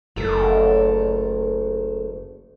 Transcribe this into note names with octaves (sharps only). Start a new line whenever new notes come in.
F#1 A3 A4 A#4